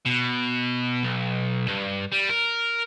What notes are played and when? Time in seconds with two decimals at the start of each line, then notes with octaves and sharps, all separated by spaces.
0.06 B2
1.04 B1
1.68 G2
2.12 G3
2.30 A#4